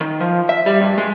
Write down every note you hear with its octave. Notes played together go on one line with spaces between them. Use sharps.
D#3
F3
E5
G3
G2
G#3